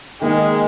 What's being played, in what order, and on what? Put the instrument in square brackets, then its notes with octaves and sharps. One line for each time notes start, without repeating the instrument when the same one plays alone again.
[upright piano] D#3 A#3 D#4 [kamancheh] G#3